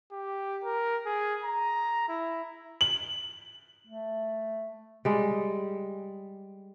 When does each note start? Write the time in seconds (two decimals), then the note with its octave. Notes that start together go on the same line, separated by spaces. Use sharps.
0.12 G4
0.64 A#4
1.06 G#4
1.44 A#5
2.09 E4
2.81 F#7
3.87 A3
5.05 G3 G#3